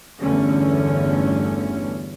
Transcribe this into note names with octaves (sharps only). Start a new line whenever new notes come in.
G1 E2 D3 A3 C#4